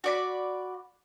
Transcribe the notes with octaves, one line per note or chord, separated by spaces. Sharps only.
F#4 D5 B5